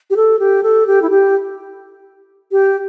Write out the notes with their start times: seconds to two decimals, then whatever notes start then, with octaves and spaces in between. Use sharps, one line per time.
0.10 G4
0.16 A4
0.39 G4
0.63 A4
0.87 G4
1.02 E4
1.10 G4
2.52 G4